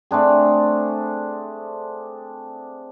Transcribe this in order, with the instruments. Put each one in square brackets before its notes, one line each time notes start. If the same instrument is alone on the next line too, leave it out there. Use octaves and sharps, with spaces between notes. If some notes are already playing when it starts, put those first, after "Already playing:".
[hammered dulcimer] A3 C4 D4 G#4